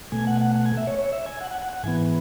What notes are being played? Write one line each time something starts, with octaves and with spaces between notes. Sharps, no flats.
B2 A3 G#5
F#5
F#5
F#5
G#5
E5
C#5
C#5
E5
G#5
F#5
F#5
F#5
F#5
G#2 E3 B3 G#5